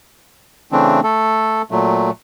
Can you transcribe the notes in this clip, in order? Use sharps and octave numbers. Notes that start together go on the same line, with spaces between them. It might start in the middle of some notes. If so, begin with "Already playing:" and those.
C#3 E3 A3 C4 D4
A3 A4
A#2 F#3 A3